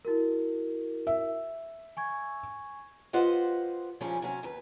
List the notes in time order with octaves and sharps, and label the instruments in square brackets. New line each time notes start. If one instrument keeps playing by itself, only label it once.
[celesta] E4 F#4 A#4
[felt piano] E5
[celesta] G#5 C#6 G#6
[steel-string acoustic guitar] F4 G4 B4 C5 D#5 F#5
G#2 C#3 F3 G3 C#4
C3 F#3 C#4
D#2 B4